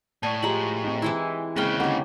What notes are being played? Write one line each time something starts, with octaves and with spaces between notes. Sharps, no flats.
A2 D5 G#5 A5
F3 G#3 G4 A#5 F#7
C4 D#4
E3 G#3 E4
D#2 C#3 G#3 C4 G#4 B4 G5 F6
D3 A#3 C#4 D#4 G4 F#5